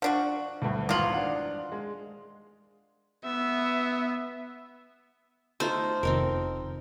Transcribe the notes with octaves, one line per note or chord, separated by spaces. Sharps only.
F3 D4 F#4 F#5
D2 G2
G#1 E2 F3 F4 F#7
D4 F#5
G#3
B3 E5
A3 D#4 F4 C5
F1 D#3 C4 D#4 A#4